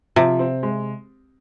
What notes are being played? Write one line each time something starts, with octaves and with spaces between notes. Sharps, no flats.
C3 F3
C4
G#3